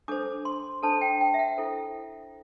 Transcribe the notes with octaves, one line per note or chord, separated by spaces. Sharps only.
D4 A4 C5 D6
C6
D4 A4 C5 A5
G5
G5
E5
F#5
E4 A4 C5